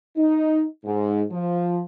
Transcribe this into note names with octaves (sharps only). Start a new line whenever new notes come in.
D#4
G#2
F3